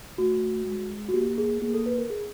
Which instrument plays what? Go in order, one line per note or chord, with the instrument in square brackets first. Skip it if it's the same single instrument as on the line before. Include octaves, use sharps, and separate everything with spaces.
[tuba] A3 [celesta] F#4
[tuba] G#3
[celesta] F#4
[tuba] A#3 [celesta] G4
[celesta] G#4
[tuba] A#3 [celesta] G#4
[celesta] A4
B4
A#4
G#4